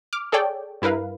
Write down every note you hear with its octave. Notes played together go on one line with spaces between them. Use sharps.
D6 F6
G#4 A4 C#5 D5 G5
G2 E4 A#4 B4 F5